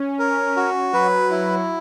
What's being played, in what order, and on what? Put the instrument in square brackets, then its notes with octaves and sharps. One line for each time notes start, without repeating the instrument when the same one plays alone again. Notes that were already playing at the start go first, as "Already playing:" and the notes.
Already playing: [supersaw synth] C#4
[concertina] A#4
F#4
[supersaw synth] F#3 [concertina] B4
[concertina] E4